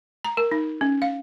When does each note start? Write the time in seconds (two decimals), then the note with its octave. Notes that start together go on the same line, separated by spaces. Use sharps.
0.25 A#5
0.37 A#4
0.51 D#4
0.81 C#4
1.02 F5